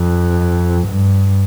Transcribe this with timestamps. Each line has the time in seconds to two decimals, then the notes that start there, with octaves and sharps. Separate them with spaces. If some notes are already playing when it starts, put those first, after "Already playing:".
Already playing: F2
0.87 G2